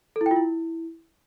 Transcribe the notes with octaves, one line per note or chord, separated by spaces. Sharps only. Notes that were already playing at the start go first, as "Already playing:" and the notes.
A4
E4
G5
F4
E4